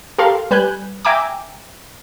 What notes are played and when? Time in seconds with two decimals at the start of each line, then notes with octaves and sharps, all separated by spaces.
0.18 G4 A4 A#4 F5 C6
0.51 G3 B4 G#5 F#6 G6
1.05 E5 G5 G#5 A#5 D6